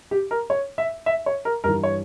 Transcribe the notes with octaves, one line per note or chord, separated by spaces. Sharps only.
G4
A#4
C#5
E5
E5
C#5
A#4
G2 E3 A#4
C#5